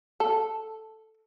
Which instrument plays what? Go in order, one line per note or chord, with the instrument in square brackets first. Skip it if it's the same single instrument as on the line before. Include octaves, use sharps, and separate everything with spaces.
[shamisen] A4